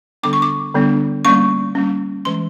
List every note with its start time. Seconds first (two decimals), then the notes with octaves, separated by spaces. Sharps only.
0.23 D3 G3 B3 D4 D6
0.33 C#6
0.42 D6
0.74 D3 G3 B3 D4
1.25 G3 A#3 C#4 C#6
1.75 G3 A#3 C#4
2.25 E3 G#3 C#4 C6